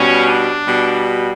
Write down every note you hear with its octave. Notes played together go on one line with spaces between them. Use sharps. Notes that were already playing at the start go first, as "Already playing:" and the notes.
Already playing: B2 G3 C#4
D4
B2 G3